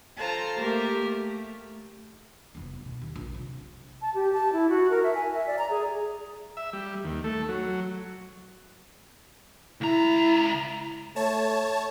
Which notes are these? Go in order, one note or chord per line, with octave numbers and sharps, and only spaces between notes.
F4 A4 C5 A5 A#5
A3 A#3 G4 A#4
A3
F1 B3
B2
D#2
A#1
C3
A5
G4
A5
E4
F#4
A#4
E5
G#5
E5
D5
A#5
G#4
E5
G3
D#2
A3
F#3
C#2 E4 A#5
A3 C#5 A5